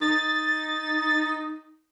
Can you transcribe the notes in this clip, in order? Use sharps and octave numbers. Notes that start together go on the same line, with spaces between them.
D#4 A6